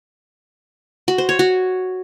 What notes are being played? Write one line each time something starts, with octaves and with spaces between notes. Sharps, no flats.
F#4
C5
C#5
F#4